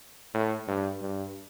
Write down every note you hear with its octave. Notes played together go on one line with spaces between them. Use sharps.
A2
G2
G2